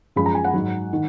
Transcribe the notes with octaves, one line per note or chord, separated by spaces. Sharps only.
F#2 F3 G#3 B5
A#5
G#5
F#5
G#2 F#3
D#3